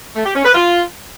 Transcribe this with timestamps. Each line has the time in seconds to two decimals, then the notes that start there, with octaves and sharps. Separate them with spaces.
0.16 A3
0.25 G4
0.35 C#4
0.45 B4
0.55 F4